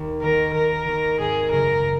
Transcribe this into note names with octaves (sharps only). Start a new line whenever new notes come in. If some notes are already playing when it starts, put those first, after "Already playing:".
Already playing: D#2
D#3 A#3 A#4
D#2 A#4
D#3 A#3
G#1 G#4
F#2 C#3 A#4